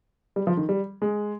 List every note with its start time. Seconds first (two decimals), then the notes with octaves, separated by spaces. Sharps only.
0.36 G3
0.47 F3
0.57 D#3
0.69 G3
1.02 G#3